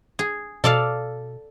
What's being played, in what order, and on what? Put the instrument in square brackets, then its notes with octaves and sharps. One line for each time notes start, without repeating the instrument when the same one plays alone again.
[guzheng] G#4
[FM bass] B2 [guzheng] A4 D5 F5